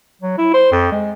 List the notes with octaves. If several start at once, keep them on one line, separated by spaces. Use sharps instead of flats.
F#3
E4
C5
F2
G#3